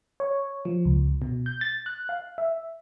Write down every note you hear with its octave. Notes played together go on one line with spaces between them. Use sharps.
C#5
F3
C#2
B2
G6
A6
F#6
F5
E5